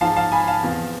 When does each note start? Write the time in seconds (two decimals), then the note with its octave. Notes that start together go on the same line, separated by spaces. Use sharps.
0.01 G#2 F3 F5 A5
0.16 F5 A5
0.32 G#5 B5
0.47 F5 A5
0.63 E2 C3 F3